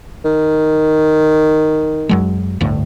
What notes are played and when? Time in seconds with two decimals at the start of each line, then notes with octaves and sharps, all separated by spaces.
0.25 D#3
2.09 F#2 F#3 G#3
2.61 G1 D2 A2